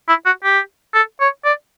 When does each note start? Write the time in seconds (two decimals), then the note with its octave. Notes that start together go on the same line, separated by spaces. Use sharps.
0.09 E4
0.26 F#4
0.44 G4
0.94 A4
1.20 C#5
1.45 D5